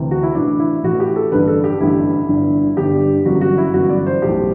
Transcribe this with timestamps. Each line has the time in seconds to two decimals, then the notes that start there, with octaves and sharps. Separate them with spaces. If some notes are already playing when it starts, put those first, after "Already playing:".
Already playing: D2 C3 E3
0.11 F#4
0.23 E4
0.35 A1 A2 E3 D4
0.59 E4
0.83 A1 A2 E3 F#4
1.00 G4
1.16 A4
1.32 A1 G2 D3 B4
1.48 A4
1.64 G4
1.80 A1 G2 D3 E4
2.28 G1 G2 D3
2.77 G1 G2 D3 G4
3.25 G1 F#2 E3 F#4
3.41 F#4
3.58 E4
3.74 G1 F#2 E3 F#4
3.89 D5
4.06 C5
4.22 B1 A2 E3 G4